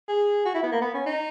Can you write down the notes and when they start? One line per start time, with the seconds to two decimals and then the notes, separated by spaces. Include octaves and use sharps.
0.09 G#4
0.45 F#4
0.54 E4
0.63 B3
0.72 A#3
0.81 B3
0.94 C#4
1.06 D#4